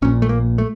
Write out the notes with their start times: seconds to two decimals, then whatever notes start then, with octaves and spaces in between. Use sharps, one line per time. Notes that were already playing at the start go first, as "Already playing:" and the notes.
0.02 A#1 A#2 C#4
0.22 A3
0.29 A#3
0.58 A3